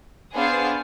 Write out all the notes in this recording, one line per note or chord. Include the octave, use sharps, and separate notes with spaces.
B3 D4 G#4 C5 F5